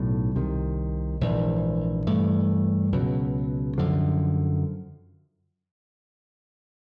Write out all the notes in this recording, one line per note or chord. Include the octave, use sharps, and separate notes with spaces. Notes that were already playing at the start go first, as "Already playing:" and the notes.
Already playing: B1 A2 F#3
C2 C3 D#3
A#1 G#2 E3
G2 E3 A3
C#2 B2 F#3
F#2 D3 F3